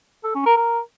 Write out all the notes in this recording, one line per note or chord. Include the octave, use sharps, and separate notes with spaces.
A4
C#4
A#4
A#4